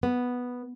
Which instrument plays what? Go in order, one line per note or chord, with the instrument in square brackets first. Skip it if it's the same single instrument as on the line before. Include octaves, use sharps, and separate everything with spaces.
[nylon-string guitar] B3